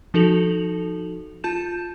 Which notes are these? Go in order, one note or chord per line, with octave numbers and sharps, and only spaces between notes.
F3 D#4 F#4 A4 F7 F#7
F4 A5 G6 E7